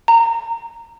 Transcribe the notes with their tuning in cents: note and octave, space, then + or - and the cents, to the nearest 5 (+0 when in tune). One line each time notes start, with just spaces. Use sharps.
A#5 -20